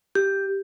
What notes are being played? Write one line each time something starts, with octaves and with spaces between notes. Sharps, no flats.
G4